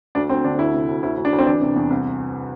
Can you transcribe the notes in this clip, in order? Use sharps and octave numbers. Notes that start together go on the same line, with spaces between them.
D2 D4
D2 C4
D3 D4
D2 E4
C3
D2
D2 E4
D2
D4
D2
C4
E3 D4
C3
E2
C2